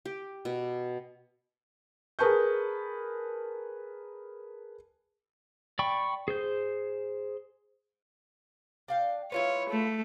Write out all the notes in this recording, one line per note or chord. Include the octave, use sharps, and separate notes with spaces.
G4
B2
G#4 A#4 B4 A5 C#6 G6
D5 G5 B5 C#6
G#4 C5 G6
D4 F5 G5
E4 F4 B4 C#5
A3